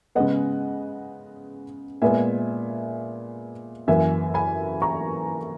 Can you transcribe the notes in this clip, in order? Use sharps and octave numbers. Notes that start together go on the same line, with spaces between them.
C#3 G#3 B3 D#5 F#5
A#2 G#3 B3 E5 G#5
F#2 E3 A#3 E5 G#5
G#5 B5
A#5 C#6